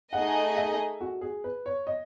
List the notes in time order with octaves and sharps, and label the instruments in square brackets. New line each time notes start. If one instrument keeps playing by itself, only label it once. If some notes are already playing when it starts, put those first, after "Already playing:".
[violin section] A3 D#4 G#4 D#5 [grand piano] F#5
[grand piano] E5
F#4
G#4
B4
C#5
D#5